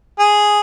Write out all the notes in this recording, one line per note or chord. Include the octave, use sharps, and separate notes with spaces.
G#4